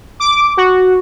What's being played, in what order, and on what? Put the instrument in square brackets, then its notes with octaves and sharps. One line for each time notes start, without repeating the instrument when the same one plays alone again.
[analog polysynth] D6
F#4